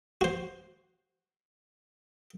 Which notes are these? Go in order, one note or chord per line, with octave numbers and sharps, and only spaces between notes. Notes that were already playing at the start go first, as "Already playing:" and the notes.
F#4 C5